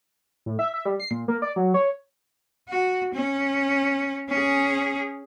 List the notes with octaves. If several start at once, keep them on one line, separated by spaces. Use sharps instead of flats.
A2
E5
E5
G3
C7
A#2
A#3
D5
F#3
C#5
F#4
C#4
C#4 G#4